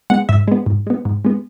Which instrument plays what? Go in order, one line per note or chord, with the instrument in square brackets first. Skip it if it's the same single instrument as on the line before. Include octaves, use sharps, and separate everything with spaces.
[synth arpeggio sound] G#3 B3 F#5
G#2 E5
G#3 B3
G#2
G#3 B3
G#2
G#3 B3